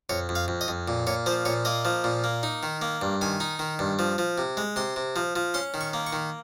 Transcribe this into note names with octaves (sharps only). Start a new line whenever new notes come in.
F2 C#5
F2
F5
F2
D#5
F2
A#2
A#2 C#5
F3 C5
A#2 C#5
A#3 D#5
F3
A#2
A#3
D#4
D#3
A#3
G2
D#3 G#5
D#4
D#3
G2
F3
F3
C3
G#3
C3 C6
C3
F3
F3
C#4 C6
D#3
C#6
A#3
C#6
D#3